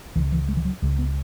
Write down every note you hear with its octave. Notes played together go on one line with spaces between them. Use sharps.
C#2 C#3 E3
E3
G#3
E3
F#3
C#2 C#3 G#3
B3